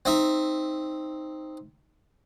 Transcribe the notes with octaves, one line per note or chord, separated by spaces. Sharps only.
C4 D#4 E5